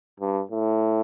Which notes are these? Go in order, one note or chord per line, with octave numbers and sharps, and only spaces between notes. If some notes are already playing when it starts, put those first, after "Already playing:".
G2
A2